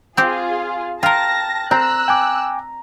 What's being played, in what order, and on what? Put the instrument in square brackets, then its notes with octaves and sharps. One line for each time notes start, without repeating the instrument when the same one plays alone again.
[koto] C4 G4 [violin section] F4 G#4
[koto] F4 A#4 [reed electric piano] G5 F6 [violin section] A5 A#6
[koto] C4 [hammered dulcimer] A#5 [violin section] E6 F#6
[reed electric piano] G5 G#5 D6